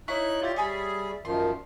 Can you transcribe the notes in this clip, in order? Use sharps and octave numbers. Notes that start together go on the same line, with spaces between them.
D#4 E4 C#5 C#6 F#6
F4 G4 D5 E5 A6
G3 G#4 C#5 G#5 B5
F#2 D#3 F3 C6